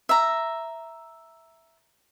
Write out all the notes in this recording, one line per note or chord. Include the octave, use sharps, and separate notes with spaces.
E5 A#5